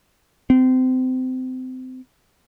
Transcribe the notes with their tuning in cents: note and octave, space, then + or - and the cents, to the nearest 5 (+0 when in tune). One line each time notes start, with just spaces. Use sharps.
C4 -30